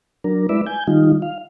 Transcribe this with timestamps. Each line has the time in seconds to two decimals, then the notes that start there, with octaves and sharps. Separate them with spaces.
0.24 F#3 D4 A#4
0.49 G#3 E4 B4 D5 E5
0.66 G#5 G6
0.87 D#3 G3 D#4 F4
1.22 F5